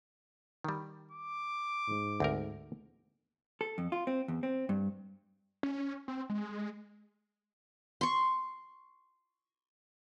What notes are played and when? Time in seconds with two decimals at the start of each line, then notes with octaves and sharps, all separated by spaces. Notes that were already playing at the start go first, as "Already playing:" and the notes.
0.64 D#3 G3
1.11 D6
1.88 G#2
2.20 D2 C4 A#4
3.61 A4
3.78 F2
3.92 F4
4.07 C4
4.28 E2
4.43 C4
4.69 G2
5.63 C#4
6.08 C4
6.30 G#3
8.01 C6 C#6